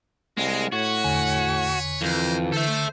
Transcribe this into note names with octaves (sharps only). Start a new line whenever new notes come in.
C2 G#3 F#4 A#4
A2 F#4 B4 C#5
E2 D3 G#5
F2 E3 G#4 A#4 C5
D3 C#4 A4 C5 E5